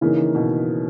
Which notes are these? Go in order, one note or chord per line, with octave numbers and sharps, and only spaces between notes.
C#3 E3 A#3 D#4
D#3
B2